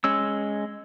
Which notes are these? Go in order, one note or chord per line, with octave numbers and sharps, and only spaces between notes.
G#3 C#4 E6